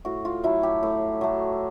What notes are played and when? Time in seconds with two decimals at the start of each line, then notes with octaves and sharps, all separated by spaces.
0.05 A2 F#4
0.25 F4
0.44 F#3 A3 E4
0.63 G4
0.83 A2
1.21 F#3 A3